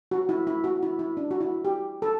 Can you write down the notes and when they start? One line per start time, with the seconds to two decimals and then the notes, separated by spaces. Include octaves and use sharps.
0.11 F#4
0.29 E4
0.47 E4
0.64 F#4
0.83 E4
0.99 E4
1.17 D4
1.31 F#4
1.41 E4
1.65 G4
2.02 A4